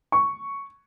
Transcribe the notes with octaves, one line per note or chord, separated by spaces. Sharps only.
C#6